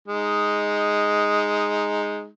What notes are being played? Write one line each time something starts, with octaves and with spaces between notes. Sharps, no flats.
G#3 D#4